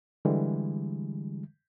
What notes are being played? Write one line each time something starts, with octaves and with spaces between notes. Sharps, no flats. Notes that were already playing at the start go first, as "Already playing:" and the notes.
D3 E3 G3 G#3